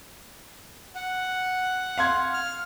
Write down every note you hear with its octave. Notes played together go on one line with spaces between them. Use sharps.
F#5
F5 C6 G#6
F6